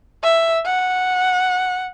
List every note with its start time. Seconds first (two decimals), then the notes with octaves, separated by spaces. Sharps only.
0.23 E5
0.66 F#5